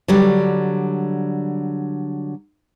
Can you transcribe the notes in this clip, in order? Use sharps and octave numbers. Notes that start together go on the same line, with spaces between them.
D3 F#3 G3